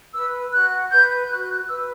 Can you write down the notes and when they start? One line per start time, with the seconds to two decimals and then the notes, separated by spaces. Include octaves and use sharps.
0.14 B4 E6
0.53 F#4 F#6
0.91 B4 G6
1.30 F#4 F#6
1.50 F#6
1.68 B4 E6